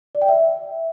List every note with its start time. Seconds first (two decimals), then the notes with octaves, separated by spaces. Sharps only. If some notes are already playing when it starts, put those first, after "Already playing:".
0.15 D5
0.22 G5
0.28 E5